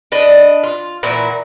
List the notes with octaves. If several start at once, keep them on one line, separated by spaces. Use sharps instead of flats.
D4 B4 D#5
F4
A#2 E3 E4 F#4